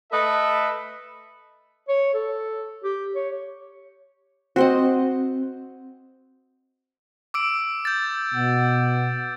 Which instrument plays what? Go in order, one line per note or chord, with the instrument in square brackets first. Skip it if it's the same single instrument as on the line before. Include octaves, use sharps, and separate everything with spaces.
[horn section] A3 A4 B4 D#5 E5
[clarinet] C#5
A4
G4
C#5
[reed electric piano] C4 [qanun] F#4 C5 D#5
[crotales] D6 E6 D7
G6 A6
[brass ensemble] B2 F#5